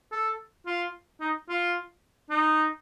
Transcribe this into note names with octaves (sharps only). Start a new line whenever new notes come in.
A4
F4
D#4
F4
D#4